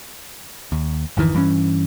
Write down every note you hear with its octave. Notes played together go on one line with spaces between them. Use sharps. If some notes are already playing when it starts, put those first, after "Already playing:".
D#2
G#1 F2 D#3 E3
G2 E3 C#4